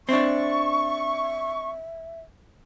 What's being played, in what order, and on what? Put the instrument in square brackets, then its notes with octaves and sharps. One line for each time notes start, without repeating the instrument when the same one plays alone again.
[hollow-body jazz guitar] C4 D4 [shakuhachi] E5 [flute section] C#6